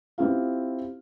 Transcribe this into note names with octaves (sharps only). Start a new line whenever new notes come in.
C4 E4 F4 G4 F5